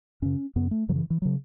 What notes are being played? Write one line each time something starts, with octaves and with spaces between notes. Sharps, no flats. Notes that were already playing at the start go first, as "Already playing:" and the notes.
F#2 C#3 C#4
F#2 C#3 B3
A3
F#2 C#3 F#3
E3
E3
C#3 F#3